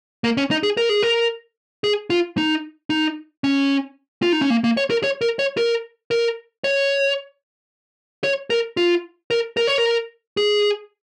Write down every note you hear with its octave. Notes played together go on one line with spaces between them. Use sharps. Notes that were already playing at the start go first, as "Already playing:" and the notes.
A#3
C#4
D#4
G#4
A#4
G#4
A#4
G#4
F4
D#4
D#4
C#4
F4
D#4
C#4
A#3
A#3
C#5
A#4
C#5
A#4
C#5
A#4
A#4
C#5
C#5
A#4
F4
A#4
A#4
C#5
A#4
G#4